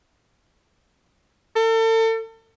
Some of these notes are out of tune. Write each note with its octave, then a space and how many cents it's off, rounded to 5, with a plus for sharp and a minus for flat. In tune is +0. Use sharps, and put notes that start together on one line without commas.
A4 +35